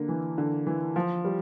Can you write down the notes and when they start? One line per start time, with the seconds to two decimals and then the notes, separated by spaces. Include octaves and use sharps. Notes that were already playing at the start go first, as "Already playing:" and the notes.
Already playing: D3 A#3
0.08 E3
0.38 D3
0.67 E3
0.96 F3
1.25 G3